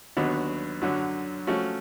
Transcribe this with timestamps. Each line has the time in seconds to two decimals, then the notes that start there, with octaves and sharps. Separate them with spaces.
0.17 D#2 D3 F#3 B3
0.82 F#2 D3 F#3
1.47 F3 A3 C#4 F#4